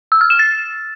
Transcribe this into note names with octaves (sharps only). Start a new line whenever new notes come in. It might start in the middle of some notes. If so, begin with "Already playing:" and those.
E6
F6
E7
A6